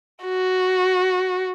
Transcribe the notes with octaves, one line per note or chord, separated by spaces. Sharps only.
F#4